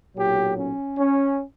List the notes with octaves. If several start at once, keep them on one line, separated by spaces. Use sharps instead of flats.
B1 A#2 F#3 G4
C#4
C#4